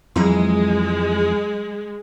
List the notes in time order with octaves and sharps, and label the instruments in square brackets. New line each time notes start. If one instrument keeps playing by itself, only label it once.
[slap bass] F2 E3 [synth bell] F#3 A#5 C6 [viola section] G#3